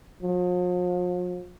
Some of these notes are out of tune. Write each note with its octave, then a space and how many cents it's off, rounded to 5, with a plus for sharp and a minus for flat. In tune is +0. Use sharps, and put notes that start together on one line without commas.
F3 +45